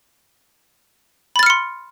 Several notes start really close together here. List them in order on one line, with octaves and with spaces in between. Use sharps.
B5 A6 F6 C#7 C6